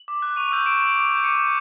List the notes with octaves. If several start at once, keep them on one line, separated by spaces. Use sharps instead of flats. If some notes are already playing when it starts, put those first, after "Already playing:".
Already playing: F#7
D6
F#6
C#6 D#7 F7
E6 G6
C#6 D7 E7
E6 G6
D6
G6
D6 C#7 D#7
G6